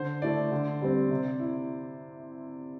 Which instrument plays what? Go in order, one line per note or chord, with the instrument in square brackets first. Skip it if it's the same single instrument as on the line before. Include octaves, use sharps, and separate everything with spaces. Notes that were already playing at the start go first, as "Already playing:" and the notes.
Already playing: [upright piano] D3 [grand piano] C5
[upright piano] A3 E4 [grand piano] D5
[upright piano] D3
G3 C4
C3
E4